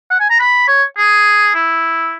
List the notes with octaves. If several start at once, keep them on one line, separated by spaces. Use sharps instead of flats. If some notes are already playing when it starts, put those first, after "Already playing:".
F#5
G#5
A#5
B5
C#5
G#4
E4